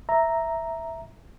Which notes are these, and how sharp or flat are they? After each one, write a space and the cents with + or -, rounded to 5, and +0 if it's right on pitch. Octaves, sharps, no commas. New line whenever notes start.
E5 +0 A#5 +0